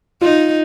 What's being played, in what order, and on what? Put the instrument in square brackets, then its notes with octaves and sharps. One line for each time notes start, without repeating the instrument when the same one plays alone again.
[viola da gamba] D#4 [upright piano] F4